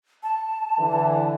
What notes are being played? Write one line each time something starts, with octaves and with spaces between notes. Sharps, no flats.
A5
D3 E3